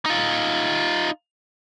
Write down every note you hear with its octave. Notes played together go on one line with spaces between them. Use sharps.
D#4 F4